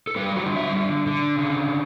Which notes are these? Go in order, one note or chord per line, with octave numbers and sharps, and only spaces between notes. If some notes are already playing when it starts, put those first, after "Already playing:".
A4
G3 B4
F#4
D3
E5
D3
D3
C#3